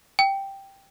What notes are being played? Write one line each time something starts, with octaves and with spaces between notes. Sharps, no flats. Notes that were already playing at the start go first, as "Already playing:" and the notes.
G5